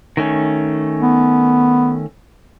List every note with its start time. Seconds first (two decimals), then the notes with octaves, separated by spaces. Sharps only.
0.17 D#3 A3 C#4
1.00 B3